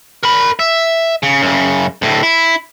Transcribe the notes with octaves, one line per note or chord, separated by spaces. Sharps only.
A#4 B5
E5
C#3
F#2 C#3
D2 A2
E4